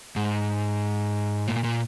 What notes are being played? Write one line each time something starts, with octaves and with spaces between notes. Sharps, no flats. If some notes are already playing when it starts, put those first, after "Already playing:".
G#2
A#2
A#2